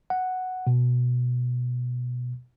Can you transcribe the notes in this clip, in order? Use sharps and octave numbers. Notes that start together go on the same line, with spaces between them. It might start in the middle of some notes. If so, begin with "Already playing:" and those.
F#5
B2